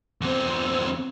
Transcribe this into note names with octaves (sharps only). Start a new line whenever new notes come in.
E2 C4